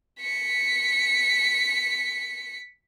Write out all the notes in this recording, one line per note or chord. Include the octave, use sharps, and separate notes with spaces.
B6 C#7